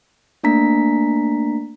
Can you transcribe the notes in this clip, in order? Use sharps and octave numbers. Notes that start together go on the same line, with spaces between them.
A3 A#3 D4 A#5 B6